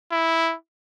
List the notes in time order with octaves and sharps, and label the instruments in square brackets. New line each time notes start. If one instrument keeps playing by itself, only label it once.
[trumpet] E4